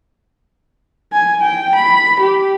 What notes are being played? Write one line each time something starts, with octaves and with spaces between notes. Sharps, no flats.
G#5
G5
B5
G4